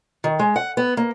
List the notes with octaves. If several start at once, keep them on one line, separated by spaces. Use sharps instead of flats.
D#3
G#3
F#5
B3
A#3